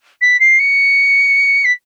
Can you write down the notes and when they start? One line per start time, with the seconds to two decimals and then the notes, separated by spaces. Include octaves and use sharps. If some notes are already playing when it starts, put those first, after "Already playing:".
0.21 B6
0.40 C7
0.59 C#7
1.65 B6